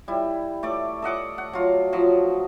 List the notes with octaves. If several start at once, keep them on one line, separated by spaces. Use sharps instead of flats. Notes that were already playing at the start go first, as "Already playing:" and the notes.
G3 E4
A3 D5 D6
A4 D#5 F#5 D6
F#5
F#3 F4
F3 F#3